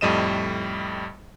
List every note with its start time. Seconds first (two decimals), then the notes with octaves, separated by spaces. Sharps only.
0.01 F2 A2 G3 D#5 D#7 E7